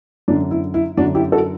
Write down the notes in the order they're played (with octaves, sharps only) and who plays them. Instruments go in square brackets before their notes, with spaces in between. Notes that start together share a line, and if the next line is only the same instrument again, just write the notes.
[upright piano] F#2 D3 D4
E4
E4
F#2 D3 D4 F#4
E4 G4
F#4 A4